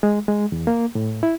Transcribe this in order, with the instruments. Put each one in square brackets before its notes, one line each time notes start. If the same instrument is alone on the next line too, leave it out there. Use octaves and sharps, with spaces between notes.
[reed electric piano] G#3
G#3
E2
A#3
A2
E4